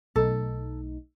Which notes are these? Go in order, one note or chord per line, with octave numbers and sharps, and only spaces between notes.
B1 A3 D#4 A4